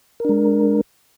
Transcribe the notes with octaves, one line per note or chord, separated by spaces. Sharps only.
G#3 D4 A#4